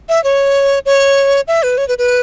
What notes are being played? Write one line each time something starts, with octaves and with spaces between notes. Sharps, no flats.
E5
C#5
C#5
E5
B4
C#5
B4
B4